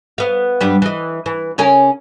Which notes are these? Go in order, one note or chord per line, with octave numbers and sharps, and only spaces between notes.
B3 F5
G2 G3 B3
E3 D#5
E3
C#3 C#4 A#4